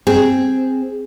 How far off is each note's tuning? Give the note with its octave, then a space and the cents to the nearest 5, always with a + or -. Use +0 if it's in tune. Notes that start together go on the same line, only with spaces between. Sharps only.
C4 +0 G#4 +0